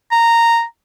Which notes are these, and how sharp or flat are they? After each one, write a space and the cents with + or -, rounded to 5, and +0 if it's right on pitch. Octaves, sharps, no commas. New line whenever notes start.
A#5 -10